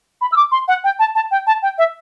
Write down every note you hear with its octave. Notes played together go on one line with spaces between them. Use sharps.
B5
E6
D6
C6
F#5
G5
A5
A5
G5
A5
G5
E5